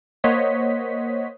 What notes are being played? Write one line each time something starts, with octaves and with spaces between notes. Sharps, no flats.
A#3 C5 C#5 D#5 F#5 B6